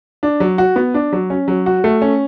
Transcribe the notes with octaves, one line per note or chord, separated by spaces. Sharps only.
D4
F#3
F#4
B3
D4
F#3
C#4
F#3
F#4
A3
C#4